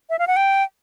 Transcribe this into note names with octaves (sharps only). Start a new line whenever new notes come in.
E5
F5
F#5
G5